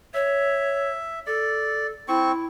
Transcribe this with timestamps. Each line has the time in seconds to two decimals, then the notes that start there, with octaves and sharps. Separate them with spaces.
0.14 C#5 E5
1.27 A4 D5
2.08 C4 E4 C#6